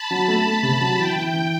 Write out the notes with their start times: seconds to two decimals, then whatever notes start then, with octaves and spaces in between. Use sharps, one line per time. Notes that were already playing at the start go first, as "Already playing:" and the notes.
Already playing: A5 B5
0.11 F#3
0.28 A3
0.46 A3
0.63 C3
0.81 F#3
0.99 E3 G5
1.16 E3
1.34 E3